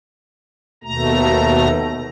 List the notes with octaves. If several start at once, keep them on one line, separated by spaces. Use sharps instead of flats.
D#2 B2 A3 A#5